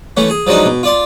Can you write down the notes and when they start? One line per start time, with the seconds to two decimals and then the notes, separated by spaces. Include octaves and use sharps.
0.17 E3 A3 C#4
0.30 G#4
0.47 F3 F#3 G#3 D4 D#4
0.65 B2
0.83 F4 D5 C6